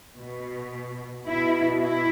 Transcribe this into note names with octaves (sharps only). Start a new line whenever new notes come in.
B2
B2 E4
E4